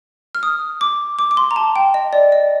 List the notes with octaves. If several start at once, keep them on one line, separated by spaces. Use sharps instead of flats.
F6
D#6
D6
D6
D6
C6
A#5
A5
G5
D#5
D5
D#5